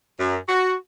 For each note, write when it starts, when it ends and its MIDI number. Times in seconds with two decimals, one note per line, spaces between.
0.19 0.37 42
0.48 0.73 66